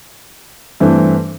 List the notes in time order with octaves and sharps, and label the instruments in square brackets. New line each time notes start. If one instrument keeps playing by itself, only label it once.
[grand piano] G2 E3 A3 C4